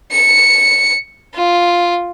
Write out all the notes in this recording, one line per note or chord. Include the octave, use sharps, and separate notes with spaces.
C#7
F4